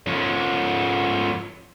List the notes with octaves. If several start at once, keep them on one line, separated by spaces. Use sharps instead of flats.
F3 C#4